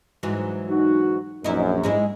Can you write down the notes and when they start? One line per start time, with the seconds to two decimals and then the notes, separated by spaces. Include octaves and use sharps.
0.23 G#2 E3 F#3
0.70 D#4 F#4
1.44 A#1 F#2 D#4 E4
1.84 G#2 G#3 E4